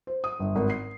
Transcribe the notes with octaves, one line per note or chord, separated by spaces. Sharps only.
C5
D#6
G1
G#1
C7